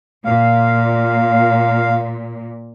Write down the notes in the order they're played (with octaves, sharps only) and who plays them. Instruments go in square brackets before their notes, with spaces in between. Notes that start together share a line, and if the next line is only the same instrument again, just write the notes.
[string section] A#2 [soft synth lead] F5